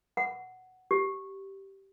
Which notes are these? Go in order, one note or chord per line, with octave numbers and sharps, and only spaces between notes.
F#5
G4